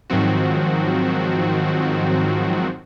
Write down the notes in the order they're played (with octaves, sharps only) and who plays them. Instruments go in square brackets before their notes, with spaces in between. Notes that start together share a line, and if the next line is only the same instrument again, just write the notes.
[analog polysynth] G#2 D#3 F3 F#3 C4 F#4